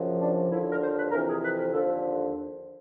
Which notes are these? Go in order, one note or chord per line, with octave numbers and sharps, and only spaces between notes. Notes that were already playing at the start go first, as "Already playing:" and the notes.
Already playing: F#2 C#3 F3
D4
D#2 D3 F3 E4
A#4
C5
B4
F2 C3 E3 A#4
G#4
B4
A#4
D#2 D3 F3 A4